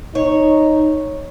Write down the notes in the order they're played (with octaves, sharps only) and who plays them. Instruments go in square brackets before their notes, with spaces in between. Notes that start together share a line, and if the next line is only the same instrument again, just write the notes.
[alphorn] D#4 [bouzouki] C#5